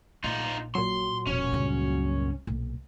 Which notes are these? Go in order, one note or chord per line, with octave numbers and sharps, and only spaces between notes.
A#1 D#4 F4
A#2 F#3 C6
E1 C#4
C#2 G2
B1 A#2